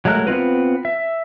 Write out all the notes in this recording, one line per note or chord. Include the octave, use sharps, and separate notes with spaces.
F#3 G#3 A3 A#4 F#6
B3 C4 F4 B4
E5